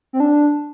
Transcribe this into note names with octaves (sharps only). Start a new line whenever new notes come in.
C4
D4